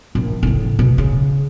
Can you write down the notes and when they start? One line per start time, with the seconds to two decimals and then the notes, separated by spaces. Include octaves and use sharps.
0.15 A#1
0.43 A2 C#3
0.79 B2
0.98 C#3